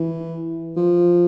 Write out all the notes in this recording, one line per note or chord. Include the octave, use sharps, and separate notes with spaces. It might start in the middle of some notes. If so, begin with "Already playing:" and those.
Already playing: E3
F3